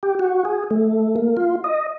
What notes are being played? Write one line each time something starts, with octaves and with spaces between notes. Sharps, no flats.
G4
F#4
G#4
A3
A#3
F4
D#5